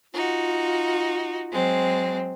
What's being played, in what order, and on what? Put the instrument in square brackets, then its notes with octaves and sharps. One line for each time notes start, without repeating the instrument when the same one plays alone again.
[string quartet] D#4 F#4 [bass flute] F4
[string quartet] F#3 G#3 C4